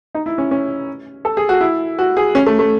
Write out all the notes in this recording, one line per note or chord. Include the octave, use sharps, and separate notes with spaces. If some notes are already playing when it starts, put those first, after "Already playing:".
D#4
E4
C#4
C#4
A4
G#4
F#4
E4
F#4
G#4
C#4
A3
A3